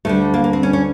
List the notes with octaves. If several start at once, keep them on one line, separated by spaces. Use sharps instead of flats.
D2 D3 G3 A3
A#3
A#3
C4
C#4
C#4